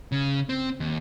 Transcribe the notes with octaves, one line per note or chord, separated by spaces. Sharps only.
C#3
C4
D#2